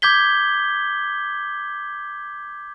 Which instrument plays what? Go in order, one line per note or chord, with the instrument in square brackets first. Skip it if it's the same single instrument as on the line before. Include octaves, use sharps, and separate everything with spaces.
[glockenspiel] D6 G6 G#6 B6 G7